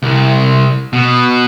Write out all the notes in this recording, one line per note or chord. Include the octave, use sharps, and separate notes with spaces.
C2
B2